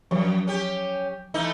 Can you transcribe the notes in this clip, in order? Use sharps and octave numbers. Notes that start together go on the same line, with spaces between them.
F#2 F3 F#3
C#4 G4
E3 A3 D#4